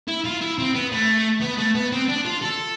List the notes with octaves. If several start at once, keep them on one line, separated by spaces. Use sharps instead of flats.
E4
F4
E4
C4
B3
A3
B3
A3
B3
C4
D4
F4
A4